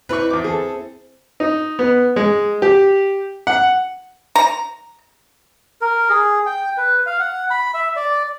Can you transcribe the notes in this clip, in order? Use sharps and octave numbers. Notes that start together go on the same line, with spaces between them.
C4 E4 B4 C#6
E2 D6
G#4 A4
D#4
B3
G#3
G4
F#5
A#5
A#4
G#4
G5
B4
F5
F#5
B5
E5
D5